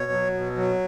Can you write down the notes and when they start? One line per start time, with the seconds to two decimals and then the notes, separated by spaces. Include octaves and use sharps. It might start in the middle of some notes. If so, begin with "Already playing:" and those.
Already playing: B2 C#5
0.11 F#3
0.34 B2
0.56 F#3